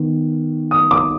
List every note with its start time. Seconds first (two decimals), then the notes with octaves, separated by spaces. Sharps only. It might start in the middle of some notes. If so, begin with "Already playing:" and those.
Already playing: D#3 B3
0.71 D#6
0.91 D6